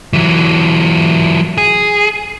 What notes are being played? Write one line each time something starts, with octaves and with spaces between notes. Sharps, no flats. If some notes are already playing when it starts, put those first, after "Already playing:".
E3 F#3
G#4